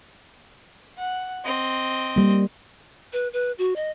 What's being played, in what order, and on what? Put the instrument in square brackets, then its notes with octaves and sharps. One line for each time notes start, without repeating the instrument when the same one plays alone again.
[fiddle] F#5
C4 D#5
[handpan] G3 A#3
[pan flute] B4
B4
F#4
D#5